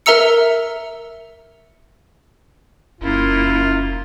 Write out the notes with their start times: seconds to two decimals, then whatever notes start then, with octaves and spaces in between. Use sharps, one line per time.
0.06 A#4 E5 A#5 E6 C#7
3.01 F1 F#2 A#3 E4 F4